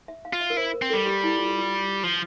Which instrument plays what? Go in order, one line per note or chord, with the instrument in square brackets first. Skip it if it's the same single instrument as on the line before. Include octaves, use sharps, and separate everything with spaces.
[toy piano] E5
F5
[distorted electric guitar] F4
[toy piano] E5
A#4
[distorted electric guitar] E4 [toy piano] C5
[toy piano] A#4
[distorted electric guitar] C4
[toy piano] A4
[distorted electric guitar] G3
[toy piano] G4
E4
F4
G4
F4
[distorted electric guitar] F3